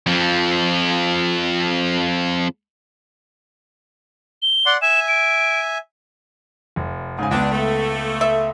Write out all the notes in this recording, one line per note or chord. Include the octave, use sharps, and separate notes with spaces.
F2 F3
G7
D5 F#5 C6
E5 G#5 E7
D7
F1
G#2 C#3 G#5
C#2 B3 D4
A3
E5